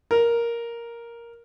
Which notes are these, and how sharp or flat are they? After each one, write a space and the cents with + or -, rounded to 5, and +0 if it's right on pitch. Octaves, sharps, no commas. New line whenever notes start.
A#4 +5